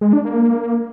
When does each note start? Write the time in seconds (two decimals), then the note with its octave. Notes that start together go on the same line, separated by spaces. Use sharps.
0.01 G#3
0.13 D4
0.25 A#3